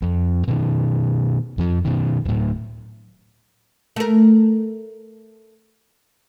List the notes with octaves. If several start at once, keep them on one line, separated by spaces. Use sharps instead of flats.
F2
B2 D#3
F2 F3
B2 D#3
D1 A2
A3 A#4